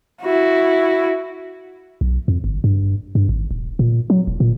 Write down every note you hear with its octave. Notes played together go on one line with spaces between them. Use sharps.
E4 F#4
B1
F2
G1
G2
G2
G#1
D#1
A#2
F#3
E1
A#2